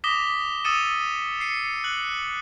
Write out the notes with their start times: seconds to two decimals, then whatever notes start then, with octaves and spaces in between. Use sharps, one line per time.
0.04 D6 D#6 A#6 B6 E7 G7
0.65 D#6 E6 A6 C#7 D#7 E7
1.40 C7 C#7 D#7
1.84 F#6 F#7